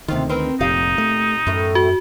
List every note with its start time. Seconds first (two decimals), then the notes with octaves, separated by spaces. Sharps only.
0.08 D2 C3 D#3 C4 F4
0.29 C4 A#4 B4
0.61 F1 A#2 D#4 G4 F5
0.98 A3
1.47 F#2 A2 E3 A3
1.75 F#4